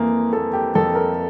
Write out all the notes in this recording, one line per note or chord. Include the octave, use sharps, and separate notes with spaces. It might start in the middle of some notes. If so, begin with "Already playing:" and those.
Already playing: F2 E3 A#3
A#3 A4
G4
F2 A4
A#4